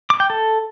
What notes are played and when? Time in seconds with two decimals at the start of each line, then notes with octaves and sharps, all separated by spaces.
0.10 D6
0.20 G5
0.30 A4